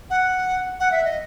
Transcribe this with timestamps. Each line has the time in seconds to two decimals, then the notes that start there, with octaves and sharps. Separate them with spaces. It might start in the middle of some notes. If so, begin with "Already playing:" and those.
0.10 F#5
0.80 F#5
0.92 E5
1.05 D#5